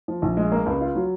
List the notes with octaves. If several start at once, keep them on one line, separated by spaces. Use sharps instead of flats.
F3
A#1
G#3
A#3
C#2
F4
F#3